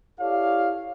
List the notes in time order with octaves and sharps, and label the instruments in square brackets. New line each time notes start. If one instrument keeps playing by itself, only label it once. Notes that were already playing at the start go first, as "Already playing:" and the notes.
[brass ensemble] E4 G4 A4 C#5 D5 F5